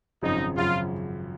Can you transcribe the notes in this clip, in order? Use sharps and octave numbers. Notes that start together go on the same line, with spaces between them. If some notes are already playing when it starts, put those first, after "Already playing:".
G#1 F#2 C#3 F3 D#4
G#1 F#2 C#3 F3 F4